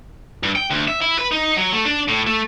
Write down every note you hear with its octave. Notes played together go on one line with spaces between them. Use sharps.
G2
G5
D2
E5
E4
B4
D#4
F#3
A3
D4
A2
A3